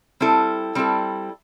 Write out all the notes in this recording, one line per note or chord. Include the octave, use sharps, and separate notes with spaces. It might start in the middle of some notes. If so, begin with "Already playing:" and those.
G3 C4 E4 A4
G3 C4 E4 A4